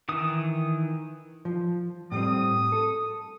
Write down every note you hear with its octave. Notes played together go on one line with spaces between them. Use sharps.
D#3 E3 D#6
F3
A2 G3 C4 D#6
A4